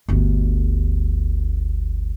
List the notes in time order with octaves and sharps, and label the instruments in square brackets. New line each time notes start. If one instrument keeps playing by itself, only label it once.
[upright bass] G1 D2